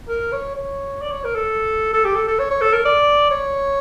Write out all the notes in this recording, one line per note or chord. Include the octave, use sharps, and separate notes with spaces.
A#4
C#5
C#5
D5
C#5
A#4
A4
A4
G4
A4
A4
C#5
C#5
A4
A#4
D5
C#5